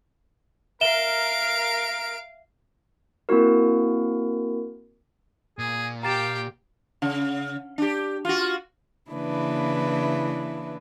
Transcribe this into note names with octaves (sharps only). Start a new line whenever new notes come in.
A#4 E5 F5 D7 E7 G7
A#3 C4 E4 F#4 A#4
A#2 G#4
G4 F5 G5 A#5 A6 E7
C#3
D4 G4
F4 F#4
C#3 E3 A#3 D4 E4 B4